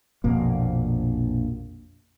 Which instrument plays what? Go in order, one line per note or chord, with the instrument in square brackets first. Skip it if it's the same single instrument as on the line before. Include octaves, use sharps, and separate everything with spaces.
[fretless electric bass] A#1 F2 B2 A#3